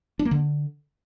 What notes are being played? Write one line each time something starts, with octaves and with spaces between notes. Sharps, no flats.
D4
A#3
D3